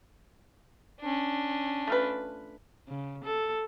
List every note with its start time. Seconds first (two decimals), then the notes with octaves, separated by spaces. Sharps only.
1.01 C#4 D4
1.87 A3 F4 B4
2.89 C#3
3.25 A4